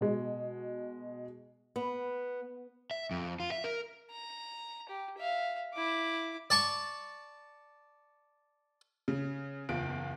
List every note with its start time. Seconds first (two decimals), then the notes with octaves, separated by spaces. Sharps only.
0.01 B2 G#3
1.76 B3
2.91 E5
3.11 F2
3.40 F4
3.52 E5
3.64 A#4
4.10 A#5
4.89 G4
5.18 E5 F5
5.75 E4 D6
6.50 D5 A5 C#6
9.08 C#3
9.69 F#1 E2 F4 D7